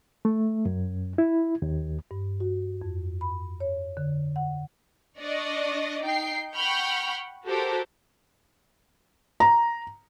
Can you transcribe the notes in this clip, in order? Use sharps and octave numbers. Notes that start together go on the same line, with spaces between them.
A3
F#2
E4
D#2
G2
F#4
F2
B5
C#5
D3
F#5
D4 D5 D#5 C#6
D#4 G5 C7
F#5 G5 B5 C#6 F6 G6
F#4 G4 A4 A#4 C5
A#5